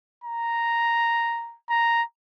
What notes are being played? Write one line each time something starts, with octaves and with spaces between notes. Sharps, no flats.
A#5
A#5